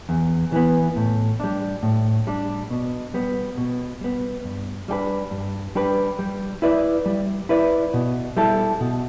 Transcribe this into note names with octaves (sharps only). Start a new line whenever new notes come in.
E2
E3 B3
A2
G3 D4
A2
G3 D4
B2
G3 B3
B2
G3 B3
G2
G3 D4 G4 B4
G2
G3 D4 G4 B4
G3
E4 B4 D5
G3
E4 B4 D5
B2
G3 E4 A4
B2